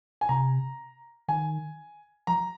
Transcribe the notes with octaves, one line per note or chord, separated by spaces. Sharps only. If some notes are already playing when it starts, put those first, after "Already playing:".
G#5
C3 A#5
D#3 G#5
F3 A#5